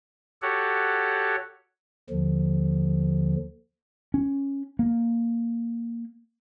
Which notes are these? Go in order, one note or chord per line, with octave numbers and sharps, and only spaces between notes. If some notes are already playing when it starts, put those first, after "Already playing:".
F#4 G4 A4 C#5 F#5
D#2 D3 F3
C#4
A#3